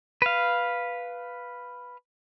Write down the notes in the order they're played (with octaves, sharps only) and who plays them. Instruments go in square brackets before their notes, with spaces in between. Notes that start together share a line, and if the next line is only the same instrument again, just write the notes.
[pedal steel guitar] B4 F5